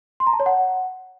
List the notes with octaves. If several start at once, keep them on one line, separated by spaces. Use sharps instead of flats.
C6
A#5
A5
C#5
F#5